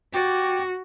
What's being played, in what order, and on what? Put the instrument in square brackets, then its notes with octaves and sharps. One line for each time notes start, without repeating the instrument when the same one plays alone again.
[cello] F#4 [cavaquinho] G4 D5